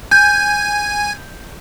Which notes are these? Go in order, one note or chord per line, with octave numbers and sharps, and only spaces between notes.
G#5 G6